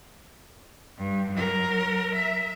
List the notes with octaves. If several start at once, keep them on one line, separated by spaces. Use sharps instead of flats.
G2
F#3 A#4
E5